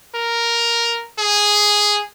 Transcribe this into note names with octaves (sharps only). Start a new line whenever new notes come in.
A#4
G#4